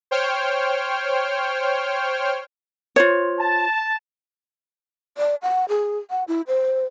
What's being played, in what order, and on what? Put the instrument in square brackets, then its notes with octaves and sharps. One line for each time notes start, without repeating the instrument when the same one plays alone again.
[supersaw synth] C5 C#5 G5 F6
[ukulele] F4 C5 C#5
[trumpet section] A5
[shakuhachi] D5
F#5
G#4
F#5
E4
C5